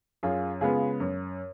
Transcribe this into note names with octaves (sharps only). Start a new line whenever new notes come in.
F#2 F4 G#4
C#3 G#3 B3 F4 G#4
F#2